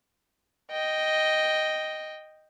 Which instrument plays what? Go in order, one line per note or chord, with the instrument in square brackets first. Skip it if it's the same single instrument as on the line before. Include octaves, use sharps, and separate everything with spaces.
[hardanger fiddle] D#5 G5